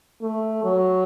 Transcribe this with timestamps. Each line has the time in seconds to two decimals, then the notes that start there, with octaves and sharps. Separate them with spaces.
0.22 A3
0.64 F#3